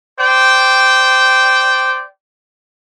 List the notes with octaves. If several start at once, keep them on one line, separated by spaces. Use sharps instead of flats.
C5 D5 G5